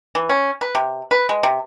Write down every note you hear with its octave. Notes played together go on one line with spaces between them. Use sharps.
E3
C#4
B4
C3
B4
G#3
C3